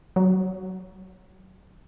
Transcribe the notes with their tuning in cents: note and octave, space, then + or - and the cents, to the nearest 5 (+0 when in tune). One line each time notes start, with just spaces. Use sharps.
F#3 +25